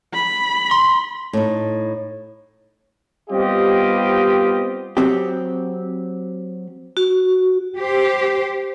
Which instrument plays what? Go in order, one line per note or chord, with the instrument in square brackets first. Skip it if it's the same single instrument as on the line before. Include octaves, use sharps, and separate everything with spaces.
[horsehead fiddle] B5
[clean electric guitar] C6
[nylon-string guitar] A2 D#4
[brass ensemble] G3 B3 C4 F4 G4 D#5
[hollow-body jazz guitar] F#3 C4 G4
[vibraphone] F#4
[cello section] G4 C5